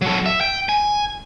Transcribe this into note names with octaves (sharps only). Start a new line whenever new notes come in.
F#3 A4
E5
G5
G#5